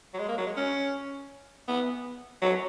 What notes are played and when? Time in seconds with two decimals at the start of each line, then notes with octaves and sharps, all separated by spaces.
0.14 F#3
0.19 G#3
0.28 A#3
0.38 F#3
0.47 G#3
0.57 C#4
1.68 B3
2.42 F#3